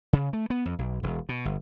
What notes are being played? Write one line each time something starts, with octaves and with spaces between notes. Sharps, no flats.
C#3
A3
B3
F2
B1
E1
B2
G1